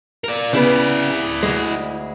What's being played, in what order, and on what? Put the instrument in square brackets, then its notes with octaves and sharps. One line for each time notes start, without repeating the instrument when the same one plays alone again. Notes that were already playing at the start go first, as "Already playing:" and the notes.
[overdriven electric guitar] A#4 D5
[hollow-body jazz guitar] C#3 B3 [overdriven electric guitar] E4 D5
[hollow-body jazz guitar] D2 G#3